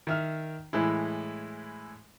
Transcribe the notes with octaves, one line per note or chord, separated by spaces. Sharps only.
D#3 E5 F6
A2 E3 G#3 E4